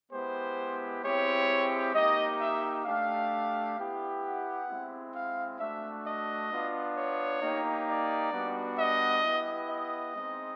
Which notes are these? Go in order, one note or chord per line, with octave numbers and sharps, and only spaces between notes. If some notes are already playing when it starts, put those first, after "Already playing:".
G#3 B3 E4 G4 C5
G#3 C4 E4 G4 C#5
A#3 D#4 G4 D#5
E5
A3 D4 G4 F5
B3 E4 G4
F#5
G#3 C4 E4
F5
A3 D4 F#4 E5
D#5
B3 D4 F4
C#5
A#3 D#4 G4
D5
G3 B3 D4 F#4
D#5
B3 E4 G4
D#5
G#3 C4 D#4